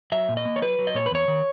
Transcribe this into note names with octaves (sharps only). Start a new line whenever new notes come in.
F#3 E5
A#2
D#5
A#3
C#5
F#3 B4
F#3
D#5
A#2 C#5
B4
E2 C#5
D#3